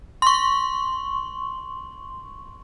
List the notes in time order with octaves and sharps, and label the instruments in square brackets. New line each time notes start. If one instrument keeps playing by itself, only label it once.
[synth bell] C6 C#6